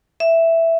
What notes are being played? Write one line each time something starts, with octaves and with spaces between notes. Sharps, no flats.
E5